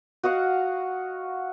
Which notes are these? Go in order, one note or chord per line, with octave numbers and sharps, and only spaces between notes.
F#4 D#5 F5 F#5